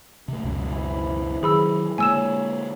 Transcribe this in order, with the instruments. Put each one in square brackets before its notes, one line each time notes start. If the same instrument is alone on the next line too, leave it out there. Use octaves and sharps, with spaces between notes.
[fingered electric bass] C3 A3
C#2 F#2 B2
[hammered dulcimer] C3 E3
[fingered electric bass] D#3 F#3 [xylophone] G#4 B5 E6
[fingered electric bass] D3 G#3 A#3 [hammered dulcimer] C#5 [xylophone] G#5 E6 E7